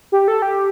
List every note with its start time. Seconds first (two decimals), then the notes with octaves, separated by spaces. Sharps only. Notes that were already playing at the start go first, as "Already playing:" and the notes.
0.12 G4
0.28 A4
0.42 G4